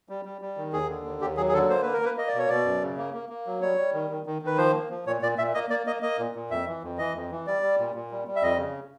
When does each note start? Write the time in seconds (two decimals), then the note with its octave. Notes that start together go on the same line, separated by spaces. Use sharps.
0.09 G3
0.25 G3
0.41 G3
0.57 D#3
0.73 D#2 G#4
0.89 D3
1.06 D#2
1.21 D#2 G4
1.37 F#3 G#4
1.49 G#4
1.54 D3 A4
1.70 A#3 C5
1.82 A#3 B4
1.93 A#4
2.02 A#3 B4
2.17 A#3 D#5
2.28 D5
2.34 B2 C#5
2.49 B2 D5
2.65 F#2
2.82 C#3
2.98 A#3
3.14 A#3
3.29 A#3
3.46 F#3
3.62 G3 C#5
3.77 G3
3.94 D#3
4.10 D#3
4.26 D#3
4.42 D#3 B4
4.58 F3 C5
4.74 A#3
4.90 F3
5.07 A#2 C#5
5.22 A#2 D5
5.38 A#2 E5
5.54 A#3 D#5
5.70 A#3 D5
5.87 A#3 D#5
6.02 A#3 D#5
6.19 A#2
6.35 A#2
6.51 F2 E5
6.67 E3
6.83 F2
6.98 E3 D#5
7.15 F2
7.31 E3
7.47 G3 D5
7.62 G3
7.79 A#2
7.95 A#2
8.11 G3
8.27 G3
8.36 E5
8.43 F2 D#5
8.58 C#3